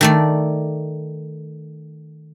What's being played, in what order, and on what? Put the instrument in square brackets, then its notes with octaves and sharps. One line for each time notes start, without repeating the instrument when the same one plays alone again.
[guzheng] D#3 A3 D5